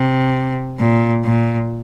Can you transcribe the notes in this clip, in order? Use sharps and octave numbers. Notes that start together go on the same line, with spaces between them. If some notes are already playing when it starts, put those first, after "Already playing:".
Already playing: C3
A#2
A#2